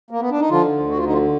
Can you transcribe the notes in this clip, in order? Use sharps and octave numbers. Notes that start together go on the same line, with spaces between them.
A#3
B3
D4
D#4
D3 F3 F4
D2
F#4
F4
D3 D#4
F3 F4